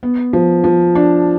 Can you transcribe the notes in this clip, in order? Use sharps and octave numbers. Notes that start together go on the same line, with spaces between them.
B3
F3
F3
D4